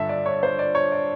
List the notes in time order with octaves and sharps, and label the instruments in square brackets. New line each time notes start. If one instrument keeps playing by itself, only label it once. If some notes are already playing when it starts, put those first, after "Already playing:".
Already playing: [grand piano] G2 D3 E5 A5
D5
C#5
C5
D5
C#5
D5